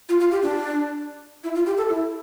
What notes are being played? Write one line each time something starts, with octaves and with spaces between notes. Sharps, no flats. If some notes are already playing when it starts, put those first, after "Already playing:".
F4
F4
G4
D4
E4
F4
G4
A4
E4